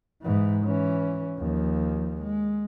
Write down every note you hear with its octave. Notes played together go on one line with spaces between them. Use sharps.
G#2 E3
E3 C#4
D#2 F3
G#3